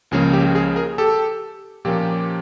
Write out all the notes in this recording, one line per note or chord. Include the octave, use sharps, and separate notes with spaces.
C#2 C#3 F3 A#3 C#4 G#4
G4
G#4
G#4 A#4
G4 A4
A#2 F3 A#3 C#4 G4